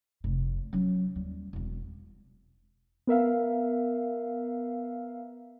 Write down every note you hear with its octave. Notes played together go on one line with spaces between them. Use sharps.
F1 C3
F#3 C#4
D#2 G3
E1 C4
B3 A#4 E5 F5